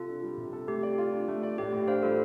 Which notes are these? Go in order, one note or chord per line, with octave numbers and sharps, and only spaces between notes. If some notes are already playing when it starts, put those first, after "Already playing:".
Already playing: C3 F4 A4
D4
G3
C3
A4
A3 G4
D5
F4
D4
A3
D5
A2 G4
A2
D4 C5 F5
G3 F4 A4